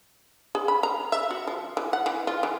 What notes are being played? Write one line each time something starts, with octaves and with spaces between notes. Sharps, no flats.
G#4
B5
A#5
E5
F#4
F3
E3
F#5
E3
F4
E3